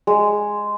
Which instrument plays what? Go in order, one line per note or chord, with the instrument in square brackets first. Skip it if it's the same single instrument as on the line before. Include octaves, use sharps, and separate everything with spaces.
[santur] G#3